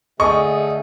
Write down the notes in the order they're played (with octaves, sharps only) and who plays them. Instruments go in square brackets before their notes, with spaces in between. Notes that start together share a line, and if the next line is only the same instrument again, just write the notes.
[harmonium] D3 A3 [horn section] G#4 A4 [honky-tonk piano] D#5 [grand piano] C#6